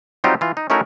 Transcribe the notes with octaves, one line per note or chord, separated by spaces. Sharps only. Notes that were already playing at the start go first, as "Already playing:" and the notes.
F#3 G3 C4 D#4 F4 G4
E3 F4
D#4
A3 C#4 D#4 E4 F#4 A#4